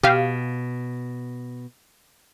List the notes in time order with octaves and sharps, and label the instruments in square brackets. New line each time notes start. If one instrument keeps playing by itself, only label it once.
[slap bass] B2 [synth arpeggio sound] G4 F5